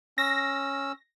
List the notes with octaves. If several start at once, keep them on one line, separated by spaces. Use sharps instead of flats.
C#4 E6 A#6